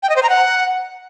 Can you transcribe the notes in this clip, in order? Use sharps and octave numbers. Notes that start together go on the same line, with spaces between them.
G5
D#5
C5
A#5
F#5